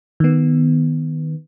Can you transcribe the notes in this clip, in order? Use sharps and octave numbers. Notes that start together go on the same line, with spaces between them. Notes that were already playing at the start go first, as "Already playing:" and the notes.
D#3 B3